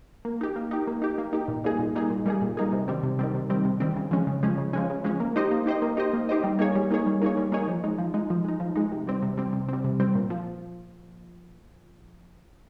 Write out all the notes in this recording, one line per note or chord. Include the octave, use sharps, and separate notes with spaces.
A#3
D#4 G4
A#3
D#4 G4
A#3
D#4 G4
A#3
D#4 G4
A#2
G3 A#3 D#4 G#4
A#2
G3 A#3 D#4 G#4
A#2
G3 A#3 D#4 G#4
A#2
G3 A#3 D#4 G#4
C3
D#3 G3 C4
C3
D#3 G3 C4
C3
D#3 G3 C4
C3
D#3 G3 C4
C#3
F3 G#3 C#4
C#3
F3 G#3 C#4
C#3
F3 G#3 C#4
C#3
F3 G#3 C#4
A#3
D#4 G4 C5 D#5
A#3
D#4 G4 C5 D#5
A#3
D#4 G4 C5 D#5
A#3
D#4 G4 C5 D#5
G3
A#3 D#4 G#4 C#5
G3
A#3 D#4 G#4 C#5
G3
A#3 D#4 G#4 C#5
G3
A#3 D#4 G#4 C#5
F3
G#3 D#4
F3
G#3 D#4
F3
G#3 D#4
F3
G#3 D#4
C3
G3 C4
C3
G3 C4
C3
G3 C4
C3
G3 C4
A#2
F3